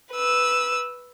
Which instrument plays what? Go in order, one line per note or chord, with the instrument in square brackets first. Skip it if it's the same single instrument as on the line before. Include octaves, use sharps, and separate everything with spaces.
[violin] B4 E6